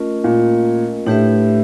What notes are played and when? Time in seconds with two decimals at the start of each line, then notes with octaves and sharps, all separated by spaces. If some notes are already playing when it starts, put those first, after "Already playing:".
Already playing: A3 C#4 F4 A#4 D#5
0.24 A#2
1.06 A2 D4 G4 B4 E5